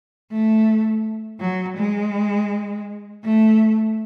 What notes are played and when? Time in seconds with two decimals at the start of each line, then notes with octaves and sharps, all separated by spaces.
0.32 A3
1.40 F#3
1.77 G#3
3.24 A3